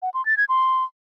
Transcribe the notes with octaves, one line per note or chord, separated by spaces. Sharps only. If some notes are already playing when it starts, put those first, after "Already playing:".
F#5
C6
A6
G#6
C6